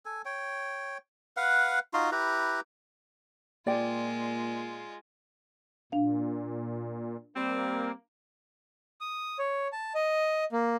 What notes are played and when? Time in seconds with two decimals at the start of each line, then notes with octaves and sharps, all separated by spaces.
0.05 A4 G#5
0.25 C#5 G5
1.37 B4 F5 F#5
1.94 D#4 F4 F#4 C6
2.12 E4 G4 B4 A#5
3.67 A#2 G#3 F4 D5 G5
5.92 A#2 D4 F5
7.36 G3 A#3 C4
9.01 D#6
9.39 C#5
9.73 A5
9.95 D#5
10.52 A#3